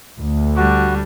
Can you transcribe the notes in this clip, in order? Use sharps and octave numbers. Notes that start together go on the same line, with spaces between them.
D2
G3 D4 F#4